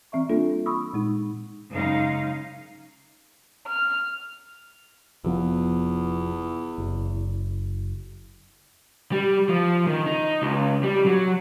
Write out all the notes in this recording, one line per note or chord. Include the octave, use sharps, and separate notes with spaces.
E3 C4 E5 C#6
G3 A#3 D4 F4 A4
B5 C#6 D#6 E6
A#2 G#3 D#4
F#2 C#3 G#3 D#4 F5
F6
F1 E2 F3 B3
F#1
G3
F3
D#3
D#4
C#2
G3
F#3